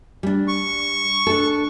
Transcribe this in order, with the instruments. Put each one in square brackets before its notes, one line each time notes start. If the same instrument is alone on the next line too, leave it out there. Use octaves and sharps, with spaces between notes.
[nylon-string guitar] G3 D4
[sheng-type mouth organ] C#6
[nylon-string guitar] D4 A4